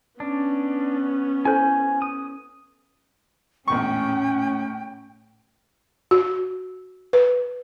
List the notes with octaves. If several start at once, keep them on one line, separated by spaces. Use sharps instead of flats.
B3 C#4 D4
E4 A4 C5 G#5 G6
D#6
A#1 E2 A2 C#4 G5 C#6
F#4
B4